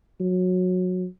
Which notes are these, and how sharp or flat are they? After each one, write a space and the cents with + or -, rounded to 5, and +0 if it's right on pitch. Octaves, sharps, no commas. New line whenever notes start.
F#3 -20